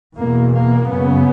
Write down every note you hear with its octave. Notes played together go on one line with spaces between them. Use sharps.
E2 B2 A#3
A#3
F#2 C#3 B3